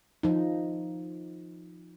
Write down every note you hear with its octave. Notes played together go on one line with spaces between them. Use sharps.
F3 D#4